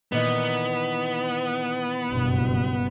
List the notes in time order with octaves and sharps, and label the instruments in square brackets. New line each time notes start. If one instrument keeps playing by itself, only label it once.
[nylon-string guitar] A#2 D#3 E3 [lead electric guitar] B3
[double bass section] F#1 G2 B2